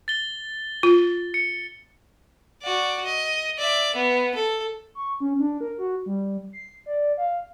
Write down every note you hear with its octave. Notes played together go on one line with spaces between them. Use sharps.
A6 G7
F4
C#7
F#4 D5
D#5
D5 E5
B3
A4
C#6
C#4
D4
A#4
F#4
G3
C7
D5
F5